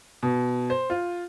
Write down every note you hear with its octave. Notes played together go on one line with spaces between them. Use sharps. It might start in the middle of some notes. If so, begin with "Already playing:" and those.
B2
C5
F4